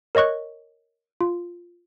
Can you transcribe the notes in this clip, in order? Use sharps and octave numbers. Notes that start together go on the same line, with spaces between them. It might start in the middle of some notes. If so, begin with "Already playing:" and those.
A#4 C#5 D#5 C#6 F#6
F4